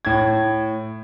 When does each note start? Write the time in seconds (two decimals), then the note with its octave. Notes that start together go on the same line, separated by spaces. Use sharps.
0.05 A2 G#6